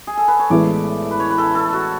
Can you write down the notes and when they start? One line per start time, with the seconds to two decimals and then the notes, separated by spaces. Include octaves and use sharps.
0.07 G#4
0.17 A4
0.28 B4
0.39 C#5
0.50 A1 A2 G#3 B3 D5
1.11 B4
1.20 C#5
1.30 B4
1.38 A4
1.55 A4
1.73 F#4